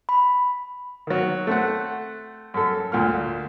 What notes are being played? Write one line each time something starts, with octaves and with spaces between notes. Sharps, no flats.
B5
D#3 F#3
A3 C4 F#5
F#2 A4
D2 A#2 F6